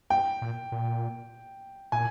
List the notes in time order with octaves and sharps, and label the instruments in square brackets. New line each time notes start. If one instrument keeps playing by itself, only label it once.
[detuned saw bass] G2 [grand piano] G5
[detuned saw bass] A#2
A#2
[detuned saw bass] A#2 [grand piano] G#5